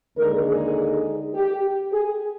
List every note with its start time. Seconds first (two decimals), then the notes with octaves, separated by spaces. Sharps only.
0.17 D#2 D3 G#3 D#4 A#4
0.47 G#4
1.34 G4
1.93 G#4